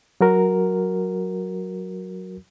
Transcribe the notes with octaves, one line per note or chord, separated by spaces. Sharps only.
F#3 F#4 A#4